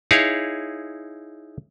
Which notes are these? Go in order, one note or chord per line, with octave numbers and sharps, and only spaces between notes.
D#4 E4 G#4 C#5 F5